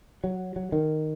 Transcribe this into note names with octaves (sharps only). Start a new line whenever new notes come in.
F#3
F#3
D#3